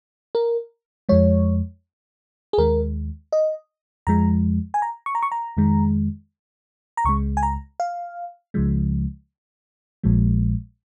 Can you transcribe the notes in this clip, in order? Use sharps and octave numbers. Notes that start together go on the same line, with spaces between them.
A#4
F2 F3 G#3 C#5
G#4
D#2 D#3 G#3 A#4
D#5
F2 F3 G#3 A#5
G#5
A#5
C#6
A#5
C#6
A#5
F2 D#3 G#3
A#5
C#2 C#3 G#3 C#6
G#5
A#5
F5
C#2 C#3 F3 G#3
A#1 A#2 F3 G#3